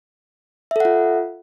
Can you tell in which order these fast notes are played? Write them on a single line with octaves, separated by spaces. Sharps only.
E5 A4 F#5 F4